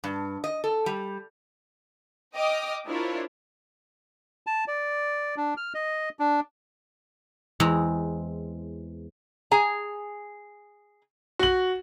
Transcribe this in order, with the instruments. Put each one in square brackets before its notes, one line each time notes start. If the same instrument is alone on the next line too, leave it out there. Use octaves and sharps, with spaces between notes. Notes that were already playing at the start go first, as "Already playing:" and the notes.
[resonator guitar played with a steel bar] G2
D#5
A4
G3
[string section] D#5 G5 D6 D#6 F6
D4 E4 F4 A#4 C5 C#5
[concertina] A5
D5
D4
F6
D#5
D4
[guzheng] E2 G#3 C4 A#5
[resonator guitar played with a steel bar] G#4 G#5 A#5
[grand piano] F#4 F#7